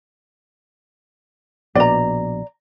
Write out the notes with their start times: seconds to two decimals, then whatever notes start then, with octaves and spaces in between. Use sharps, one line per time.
1.75 A#1 B2 D5 A#5